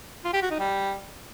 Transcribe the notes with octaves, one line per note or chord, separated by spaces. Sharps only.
F4
G4
F#4
D#4
G3